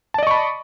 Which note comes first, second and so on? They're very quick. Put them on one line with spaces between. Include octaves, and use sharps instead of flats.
A5 D5 D#5 C#6 B5